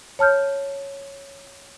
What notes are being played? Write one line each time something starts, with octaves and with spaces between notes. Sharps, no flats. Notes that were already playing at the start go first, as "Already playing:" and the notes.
C#5 A5 F6 G6